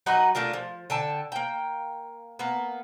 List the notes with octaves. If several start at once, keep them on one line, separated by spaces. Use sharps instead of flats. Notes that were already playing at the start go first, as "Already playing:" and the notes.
F#3 D#4 F#4 B4
A3 D4 F4 A#4
F3
D3 G5 A5
A#3 G5
A#3 B3